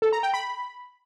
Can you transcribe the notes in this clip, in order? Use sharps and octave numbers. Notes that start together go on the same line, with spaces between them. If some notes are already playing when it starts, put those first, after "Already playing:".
A4
A#5
G5
B5